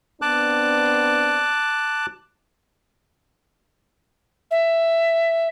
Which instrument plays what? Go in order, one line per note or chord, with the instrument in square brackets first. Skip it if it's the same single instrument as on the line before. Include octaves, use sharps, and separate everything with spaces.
[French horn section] B3 C4 D4 [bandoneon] A5 D6 F#6
[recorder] E5